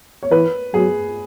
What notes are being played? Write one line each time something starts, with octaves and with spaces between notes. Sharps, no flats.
C#5
E3 B4
F#3 G#4